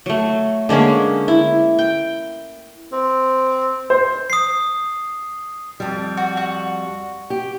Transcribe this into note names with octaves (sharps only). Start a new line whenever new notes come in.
F#3 A3
D3 G#3 A#3 C#4
E4
G5
C4
C5
D#6 C7
F2 G3
F#4
F#4
G4